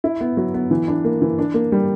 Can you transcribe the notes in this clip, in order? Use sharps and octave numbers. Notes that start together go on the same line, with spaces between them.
E4
B3
F#3
B3
E3
D4
A#3
E3
D4
A#3
G3